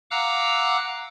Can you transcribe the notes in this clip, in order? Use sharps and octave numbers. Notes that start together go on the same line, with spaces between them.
F5 F#5 A#5 D6 E6 F#6